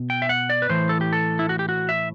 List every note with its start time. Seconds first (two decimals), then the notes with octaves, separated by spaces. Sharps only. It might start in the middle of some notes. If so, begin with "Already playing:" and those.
Already playing: B2
0.10 G5
0.22 E5
0.29 F#5
0.50 D5
0.62 B4
0.69 A2 E3 C5
0.89 A4
1.01 G4
1.13 A4
1.39 E4
1.49 F#4
1.59 G4
1.69 F#4
1.89 E5